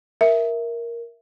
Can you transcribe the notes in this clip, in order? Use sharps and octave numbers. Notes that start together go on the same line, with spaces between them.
A#4 E5